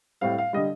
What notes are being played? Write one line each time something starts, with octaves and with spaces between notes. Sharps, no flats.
A2 G3 C4 F5
F5
D3 G3 D#5